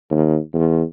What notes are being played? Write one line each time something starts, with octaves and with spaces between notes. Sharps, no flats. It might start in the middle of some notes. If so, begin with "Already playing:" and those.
D#2
E2